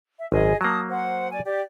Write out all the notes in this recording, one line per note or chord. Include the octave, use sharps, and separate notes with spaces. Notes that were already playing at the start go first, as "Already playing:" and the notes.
E5
G#1 F#2 G#4 D#5 G#5
F#3 A#3 A5 D#6
C5 F#5
D5 G#5
G4 D5